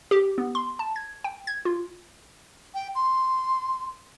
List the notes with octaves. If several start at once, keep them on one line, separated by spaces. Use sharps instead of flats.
G4
B3
C6
A5
G#6
G5
G#6
F4
G5
C6